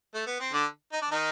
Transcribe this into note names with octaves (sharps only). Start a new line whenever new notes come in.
A3
B3
C4
D3 D4
D#4
D4
D#3 D#4